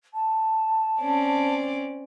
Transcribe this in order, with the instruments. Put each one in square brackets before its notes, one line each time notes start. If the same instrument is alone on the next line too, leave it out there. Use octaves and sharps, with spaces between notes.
[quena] A5
[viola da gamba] C4 C#4 D5